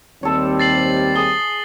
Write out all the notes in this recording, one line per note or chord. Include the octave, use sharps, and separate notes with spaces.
D#2 G3 C4 A4 C#5
A6 C7 F#7
G#4 D#6 G7